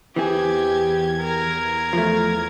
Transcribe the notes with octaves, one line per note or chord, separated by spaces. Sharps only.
E2 E3 C4 G4 G#4 G#6
A#4
F3 A3